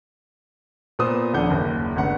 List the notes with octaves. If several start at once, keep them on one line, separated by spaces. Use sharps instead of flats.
A#2 B3 C5 D#6
D#1 F3 D4 F#5 G6
F#1 D#2
G1 C#2 F#5